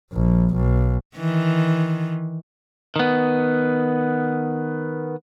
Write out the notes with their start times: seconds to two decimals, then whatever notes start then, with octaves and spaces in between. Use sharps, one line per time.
0.13 A#1
0.55 B1
1.17 D#3 E3
2.96 D#3 B3